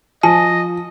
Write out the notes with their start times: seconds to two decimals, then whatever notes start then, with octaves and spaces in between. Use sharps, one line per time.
0.23 F3 D#5 G#5 A5